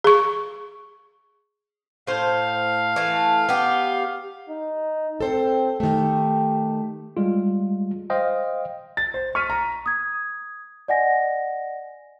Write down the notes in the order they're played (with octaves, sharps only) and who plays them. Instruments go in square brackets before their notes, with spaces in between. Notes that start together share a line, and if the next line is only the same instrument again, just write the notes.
[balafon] G#4 C#6
[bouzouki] A2 C5 [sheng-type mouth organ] F5
[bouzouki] E3 A3
B3 G4
[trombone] D#4
[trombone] C4 [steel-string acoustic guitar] A4 C5
[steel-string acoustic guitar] D#3 A3 [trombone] G4
[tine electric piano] G3 G#3 F4
C5 D#5 F5 G5
[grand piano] A6
C5
C#6 F6 B6 D#7
A#5
[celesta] D#6 G#6
D5 D#5 F#5 G#5 A#6